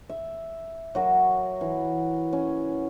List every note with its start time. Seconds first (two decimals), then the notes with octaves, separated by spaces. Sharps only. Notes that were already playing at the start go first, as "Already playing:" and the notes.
0.09 E5
0.95 F#3 F#4 A#4
1.61 E3
2.33 C#4